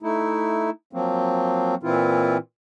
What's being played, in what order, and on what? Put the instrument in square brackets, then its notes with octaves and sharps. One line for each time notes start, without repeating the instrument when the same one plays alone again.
[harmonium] A3 D#4 E4
F3 F#3 A#3 C4
A#2 E3 C4 E4 F4